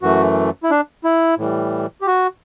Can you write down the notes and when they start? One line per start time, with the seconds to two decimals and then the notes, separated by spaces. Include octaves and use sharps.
0.02 F#2 E3 A3 F#4
0.63 E4
0.71 D4
1.04 E4
1.38 A2 E3 G3
2.01 G4
2.07 F#4